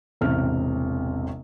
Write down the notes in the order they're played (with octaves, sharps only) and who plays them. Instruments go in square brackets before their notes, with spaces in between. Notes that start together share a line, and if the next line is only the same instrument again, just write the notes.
[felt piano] E1 A1 C3 F6